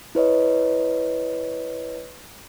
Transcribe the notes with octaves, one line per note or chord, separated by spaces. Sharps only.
E4 B4 C#5 D#5